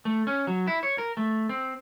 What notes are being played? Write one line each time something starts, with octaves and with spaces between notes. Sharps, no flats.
A3
C#4
F#3
E4
C#5
A#4
A3
C4